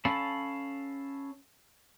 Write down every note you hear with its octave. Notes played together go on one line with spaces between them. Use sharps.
C#4 A4 F5 A5 B5